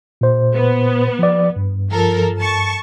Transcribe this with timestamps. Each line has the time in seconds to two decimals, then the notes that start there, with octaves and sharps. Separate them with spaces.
0.21 A#2 C5
0.54 B3
1.19 F3 D5
1.56 G2
1.90 F3 A4 A#4
2.39 A5 C#6